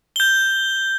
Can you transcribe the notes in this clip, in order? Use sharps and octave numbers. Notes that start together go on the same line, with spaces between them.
G6 G7